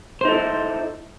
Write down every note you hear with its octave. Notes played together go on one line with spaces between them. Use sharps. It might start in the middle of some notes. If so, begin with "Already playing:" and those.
D#4 E4 A4 C5